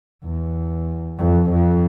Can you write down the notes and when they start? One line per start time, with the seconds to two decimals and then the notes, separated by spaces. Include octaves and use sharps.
0.24 E2
1.19 F2
1.50 F2